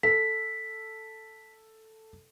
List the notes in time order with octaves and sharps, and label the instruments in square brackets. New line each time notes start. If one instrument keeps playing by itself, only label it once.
[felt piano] A4 [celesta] B6